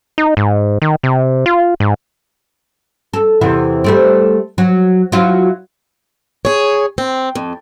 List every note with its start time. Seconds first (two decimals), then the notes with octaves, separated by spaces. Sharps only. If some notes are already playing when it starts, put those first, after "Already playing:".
0.18 D#4
0.37 G#2
0.82 D#3
1.03 C3
1.46 F4
1.80 G#2
3.13 A4
3.41 E2 C3 E3
3.84 G3 A3 C4
4.58 F#3
5.12 F#3 E4 F4
6.45 G#4 C#5
6.98 C4
7.35 F2